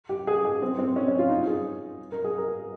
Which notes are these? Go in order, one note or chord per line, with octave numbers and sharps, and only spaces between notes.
G4
G#4
G#4
C4
C4
C#4
C#4
F4
D#4
G#4
A#4
G#4
A#4